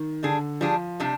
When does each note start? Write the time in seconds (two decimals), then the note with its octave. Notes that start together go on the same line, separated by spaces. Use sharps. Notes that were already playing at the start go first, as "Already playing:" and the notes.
Already playing: D#3
0.23 D3 G3 D4 G#4
0.61 F3 G3 D4 G#4
1.00 C3 G3 D4